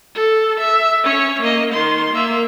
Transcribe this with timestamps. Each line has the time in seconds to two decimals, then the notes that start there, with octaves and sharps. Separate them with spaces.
0.14 A4
0.59 E5
1.04 C#4 C#5
1.42 A#3 D#5
1.73 D#3 C6
2.14 A#3 E5